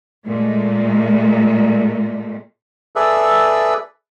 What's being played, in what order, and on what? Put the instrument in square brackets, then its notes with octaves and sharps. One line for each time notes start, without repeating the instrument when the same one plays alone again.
[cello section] A#2 G#3 A3
[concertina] G#4 A4 B4 D5 E5